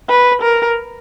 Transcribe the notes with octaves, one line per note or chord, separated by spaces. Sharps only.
B4
A#4